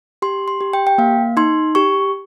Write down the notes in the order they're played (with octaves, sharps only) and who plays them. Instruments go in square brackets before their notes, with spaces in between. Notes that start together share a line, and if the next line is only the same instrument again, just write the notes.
[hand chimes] G4 C6
C6
G4
G5
G5
A#3 F5
D#4 C6
G4 C#6